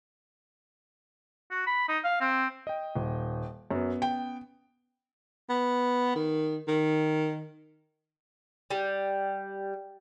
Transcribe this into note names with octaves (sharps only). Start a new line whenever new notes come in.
F#4
B5
D#4
F5
C4
D#5 G5
D#1
F#2 B3 C#4
G5
B3
D#3
D#3
G3